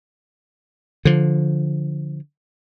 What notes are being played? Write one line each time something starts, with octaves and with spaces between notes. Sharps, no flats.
D3 F3